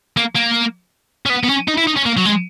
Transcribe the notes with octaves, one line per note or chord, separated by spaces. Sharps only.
A#3
A#3
C#4
B3
B3
C#4
D#4
E4
D#4
C#4
A#3
F#3
G#3